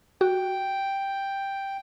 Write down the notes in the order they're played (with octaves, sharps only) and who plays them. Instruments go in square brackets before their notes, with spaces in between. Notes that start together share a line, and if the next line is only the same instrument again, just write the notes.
[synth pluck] F#4 [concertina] G5